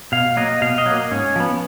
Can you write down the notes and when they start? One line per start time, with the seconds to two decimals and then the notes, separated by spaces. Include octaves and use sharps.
0.12 B2 F5
0.37 F#3 A#3 D#5
0.61 B2 F5
0.78 D#5
0.86 F#3
0.91 A#3
1.11 G#2 C#4
1.36 F3 B3